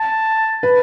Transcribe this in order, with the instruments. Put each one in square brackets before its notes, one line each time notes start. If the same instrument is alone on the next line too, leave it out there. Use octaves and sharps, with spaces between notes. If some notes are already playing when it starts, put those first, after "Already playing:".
Already playing: [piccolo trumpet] A5
[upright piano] B4